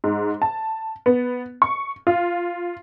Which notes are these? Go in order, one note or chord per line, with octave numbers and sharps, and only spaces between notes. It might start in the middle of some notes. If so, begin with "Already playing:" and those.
G#2
A5
B3
C#6
F4